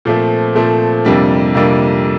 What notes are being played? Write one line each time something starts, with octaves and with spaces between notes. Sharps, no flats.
A#2 F3 A3 C4
A#2 F3 A3 C4
F2 C3 G3 A#3 D4
F2 C3 G3 A#3 D4